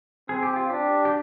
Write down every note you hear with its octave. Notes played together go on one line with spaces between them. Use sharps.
C4 G#4
G4
F4
D4 G4
G4